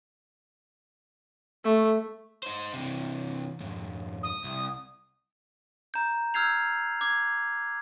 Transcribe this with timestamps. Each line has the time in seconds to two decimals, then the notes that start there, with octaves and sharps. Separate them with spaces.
1.64 A3
2.43 D#4 C5
2.73 C3 E3
3.60 F2 G#2
4.23 D#6
4.44 C2
5.94 A#5 G6
6.34 E6 F6 G6 G#6 C7 F7
7.01 D6 G#6